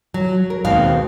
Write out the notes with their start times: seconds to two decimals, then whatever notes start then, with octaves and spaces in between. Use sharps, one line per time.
0.14 F#3
0.50 A#4
0.65 D#2 G#2 B2 D#3 C4 F5